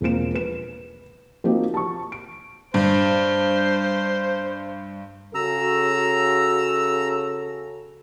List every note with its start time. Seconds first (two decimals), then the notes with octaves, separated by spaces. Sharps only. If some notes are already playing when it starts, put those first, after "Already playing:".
0.01 E1 F3 A#3 C4 D7 E7
0.34 B4 E7
1.44 F3 A#3 C4 D#4 F#4 G4
1.74 A5 C#6
2.12 D7
2.74 G2 C5
5.35 C#3 F#4 A4 A#5 E6